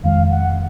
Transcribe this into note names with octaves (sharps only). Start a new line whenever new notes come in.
F2 D#3 G#3 C#4 F5
F#5